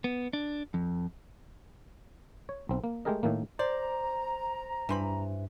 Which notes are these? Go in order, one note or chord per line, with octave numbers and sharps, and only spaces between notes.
B3
D4
F2
C#5
B1 C4
A#3
G#3 A3 G4 G#4 A#4 D#5
A2 D#3 A3 A#3
C5 D5 A#5
G2 E3 C5 B5